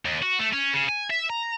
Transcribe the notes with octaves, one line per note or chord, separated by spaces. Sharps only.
D#2
F#4
A3
C#4
C#3
G#5
E5
A#5